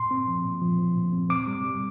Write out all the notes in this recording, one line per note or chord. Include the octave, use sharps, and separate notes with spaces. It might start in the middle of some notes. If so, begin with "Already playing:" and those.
Already playing: A#2 C6
C4
F3
A#2
F3
F3
A#2
C4
C4 D6
G3
G3